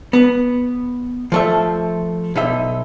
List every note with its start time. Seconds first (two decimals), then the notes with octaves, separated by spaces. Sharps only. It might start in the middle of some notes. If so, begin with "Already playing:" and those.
0.13 B3
1.32 F3 A3 E5
2.36 B1 D#4 E5